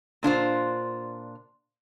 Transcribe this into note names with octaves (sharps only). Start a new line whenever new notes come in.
A#2 D4 F4 C5